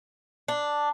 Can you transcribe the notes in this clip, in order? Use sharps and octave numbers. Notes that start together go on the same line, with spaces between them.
D4